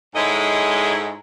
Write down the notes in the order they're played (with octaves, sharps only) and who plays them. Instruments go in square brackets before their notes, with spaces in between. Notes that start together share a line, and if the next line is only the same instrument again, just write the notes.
[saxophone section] G#2 G#3 E4 A4 C#5 D#5